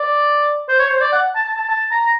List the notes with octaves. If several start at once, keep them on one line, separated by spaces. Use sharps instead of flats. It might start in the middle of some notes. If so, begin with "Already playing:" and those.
Already playing: D5
C5
C#5
C5
D5
F#5
A5
A5
A5
A5
A#5